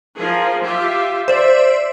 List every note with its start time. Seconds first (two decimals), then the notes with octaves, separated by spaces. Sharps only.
0.18 F3 G#4 A#4
0.64 F4 G4 E5
1.28 C5 D5 E5